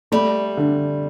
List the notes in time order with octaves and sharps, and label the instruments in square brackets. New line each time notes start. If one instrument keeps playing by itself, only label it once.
[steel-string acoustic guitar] G3 [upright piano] A3
[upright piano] D3